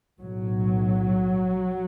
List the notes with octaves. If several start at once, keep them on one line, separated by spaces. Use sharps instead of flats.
B1 A2 F#3